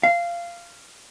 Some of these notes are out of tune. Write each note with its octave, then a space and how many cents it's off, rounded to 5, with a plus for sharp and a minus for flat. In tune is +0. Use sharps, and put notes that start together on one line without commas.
F5 -15